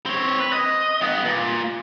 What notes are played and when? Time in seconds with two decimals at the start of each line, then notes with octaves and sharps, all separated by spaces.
0.06 C4 C#5
0.40 B4
0.53 D#5
1.01 G2 B3
1.25 A#2